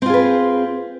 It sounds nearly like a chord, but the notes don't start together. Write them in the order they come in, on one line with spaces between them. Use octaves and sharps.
C4 F4 G#4 B4